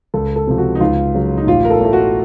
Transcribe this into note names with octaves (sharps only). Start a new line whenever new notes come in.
C#2 A4
A4
C3 F3
F#4
D#4
C#2 F4
C#3 F#3
D#4
A1 F4
A#4
A4
A2 A3
F#4